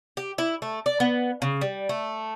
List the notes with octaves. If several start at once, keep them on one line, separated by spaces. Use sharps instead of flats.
G4
E4
A3
D5
B3
C#3
G3
A3